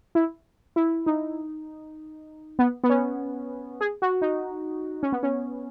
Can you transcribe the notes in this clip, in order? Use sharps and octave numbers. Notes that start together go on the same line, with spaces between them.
E4
E4
D#4
B3
B3
C#4
G#4
F#4
D#4
C#4
B3
C#4